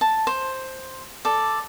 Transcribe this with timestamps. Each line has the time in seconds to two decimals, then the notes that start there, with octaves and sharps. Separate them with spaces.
0.01 A5
0.27 C5
1.25 A4 D5